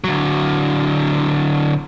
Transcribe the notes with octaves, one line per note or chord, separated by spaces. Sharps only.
D3 F#3